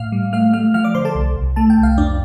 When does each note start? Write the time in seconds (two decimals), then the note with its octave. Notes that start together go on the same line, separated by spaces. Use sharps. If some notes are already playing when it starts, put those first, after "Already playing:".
Already playing: A2 F5 F6
0.12 G3
0.33 A3 F5 F6
0.53 A3 F5 F6
0.74 F3 F5 F6
0.84 D5 D6
0.94 D3 C5 C6
1.05 A4 A5
1.15 C2
1.36 C2
1.56 A3 A5
1.70 G5
1.77 C2
1.83 F5
1.97 F2 D4 D5